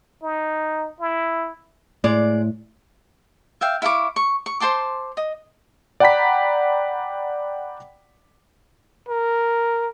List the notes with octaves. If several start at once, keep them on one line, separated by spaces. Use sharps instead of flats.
D#4
E4
A2 G#3 D5
E5 F5 G5
E4 F5 C#6 D6
C#6
C#6
C5 A5 C6 D6
D#5
D5 F#5 G5 A#5 B5 B6
A#4